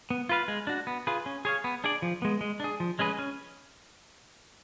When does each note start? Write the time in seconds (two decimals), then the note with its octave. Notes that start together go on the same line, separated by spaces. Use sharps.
0.10 B3
0.29 F4 B4 F5
0.48 G#3
0.67 D4 F#4
0.87 B3
1.07 F4 G#4 B4
1.26 C#4
1.45 G#4 C#5 F5
1.64 B3
1.84 D4 G#4 D5
2.02 F3
2.22 G#3 B3
2.41 G#3
2.60 D4 G#4
2.80 F3
2.99 G#3 C#4 G#4 B4
3.19 C#4